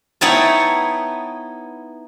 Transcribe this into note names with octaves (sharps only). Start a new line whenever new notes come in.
B3 D#4 E4 C#5 G5 A5